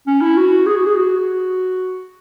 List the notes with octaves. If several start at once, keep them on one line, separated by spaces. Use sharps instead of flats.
C#4
E4
F#4
G#4
F#4
G#4
F#4